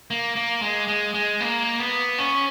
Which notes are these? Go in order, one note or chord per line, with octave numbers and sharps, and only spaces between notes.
A#3
A#3
G#3
G#3
G#3
A#3
B3
C#4